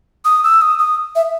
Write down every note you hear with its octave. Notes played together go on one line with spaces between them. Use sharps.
D#6
E6
D#6
D#6
E5